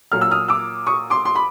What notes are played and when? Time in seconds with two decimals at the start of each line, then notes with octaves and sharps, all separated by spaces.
0.12 A#2 F#3 A#3 F6
0.21 E6
0.31 D#6 F6
0.48 D6 E6
0.87 C#6 D#6
1.10 C6 D6
1.25 C6
1.35 B5